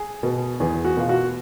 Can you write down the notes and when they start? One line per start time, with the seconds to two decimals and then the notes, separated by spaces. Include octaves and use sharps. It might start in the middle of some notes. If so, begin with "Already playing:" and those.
Already playing: G#4
0.23 B2
0.60 E2 G#4
0.85 F#4
0.97 B2 F4
1.09 F#4